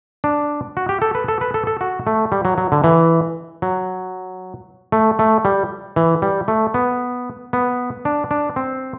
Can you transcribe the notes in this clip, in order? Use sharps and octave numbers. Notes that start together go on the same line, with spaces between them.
D4
F#4
G4
A4
B4
A4
B4
A4
A4
F#4
A3
G3
F#3
F#3
D3
E3
F#3
A3
A3
G3
E3
G3
A3
B3
B3
D4
D4
C4